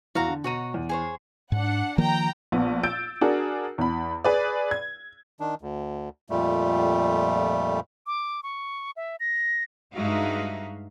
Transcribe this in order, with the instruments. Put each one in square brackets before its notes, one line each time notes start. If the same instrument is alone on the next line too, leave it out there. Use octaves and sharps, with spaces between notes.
[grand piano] E2 E4 [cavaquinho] F#4 F5 A#5
[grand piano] D3
[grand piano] B2 D#7 [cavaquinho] F#4 C#5 A#5
[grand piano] E2
[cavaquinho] G#4 C5 C#5
[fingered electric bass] G#2 [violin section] D4 F#5
[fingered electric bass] D#3 F3 A#3 [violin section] G5 A#5
[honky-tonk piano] A#1 B3
E6 G6 A6 D7
D4 F#4 G#4 A#4
E2 B5
G#4 B4 D5
G#6
[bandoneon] D#3 D4
D2
F2 A#2 G3 A3
[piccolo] D6
C#6
E5
A#6
[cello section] G2 G#3 D#4 F#4 E5 F5